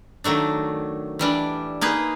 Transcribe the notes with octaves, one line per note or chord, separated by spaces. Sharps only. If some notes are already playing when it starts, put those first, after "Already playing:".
D#3 F#3 A3 D4
E3 G3 D4
A#3 D#4 G#4 B4